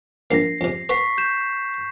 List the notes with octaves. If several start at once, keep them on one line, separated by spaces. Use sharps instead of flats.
A#1 A#3 A#6 C7
F2 C3
B4 F#5 C#6 B6 C7
G6 E7